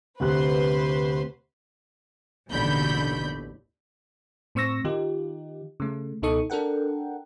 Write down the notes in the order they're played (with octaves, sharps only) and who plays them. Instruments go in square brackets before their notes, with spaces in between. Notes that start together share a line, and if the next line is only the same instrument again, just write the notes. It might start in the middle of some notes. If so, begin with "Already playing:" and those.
[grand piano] D2 C3 F#6 [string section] B4 C5 C6
[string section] A1 D#2 B2 D3 B5 G6
[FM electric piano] A2 C4 C5 C#6 E6 A#6
D#3 D#4 F4 G4
C#3 A3
C#2 B2 D#4 A4 C#6 D#6
D4 A4 A#4 F#5 G5